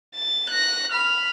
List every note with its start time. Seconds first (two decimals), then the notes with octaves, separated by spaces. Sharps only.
0.15 A6
0.50 F#6 A#6
0.92 B5 F6